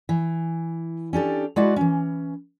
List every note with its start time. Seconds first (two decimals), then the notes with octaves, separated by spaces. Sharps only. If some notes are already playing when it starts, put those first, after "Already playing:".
0.09 E3
1.13 C#4 D4 G4 A4
1.56 G#3 E4 F#4 B4 D5 F#5
1.76 E3 C#4